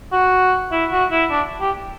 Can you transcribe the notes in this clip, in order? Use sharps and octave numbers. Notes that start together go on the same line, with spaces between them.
F#4
E4
F#4
E4
D4
G4